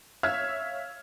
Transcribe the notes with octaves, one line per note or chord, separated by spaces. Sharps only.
C#5 E5 F5 E6 F6 G#6